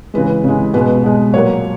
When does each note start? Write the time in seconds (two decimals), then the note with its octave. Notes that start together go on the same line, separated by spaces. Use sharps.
0.14 C#3 E3 G#3 B4
0.44 C#3 E3 G#3
0.74 B2 G#3 B4
1.04 B2 G#3
1.33 A#2 F#3 A#3 C#5